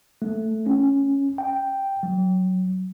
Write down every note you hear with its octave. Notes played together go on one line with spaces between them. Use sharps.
A3
C#4
G5
F#3